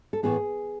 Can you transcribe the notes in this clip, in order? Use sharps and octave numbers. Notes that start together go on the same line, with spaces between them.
A4
A2 E3 B3 G#4